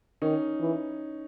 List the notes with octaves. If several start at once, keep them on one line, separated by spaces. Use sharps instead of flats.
D#3 C#4 D#4
E3